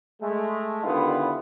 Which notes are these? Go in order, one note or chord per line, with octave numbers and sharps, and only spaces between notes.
G#3 A3
D3 D#3 G3 B3 E4 F4